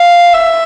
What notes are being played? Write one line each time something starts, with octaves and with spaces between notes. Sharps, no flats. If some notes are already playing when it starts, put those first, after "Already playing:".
Already playing: F5
E5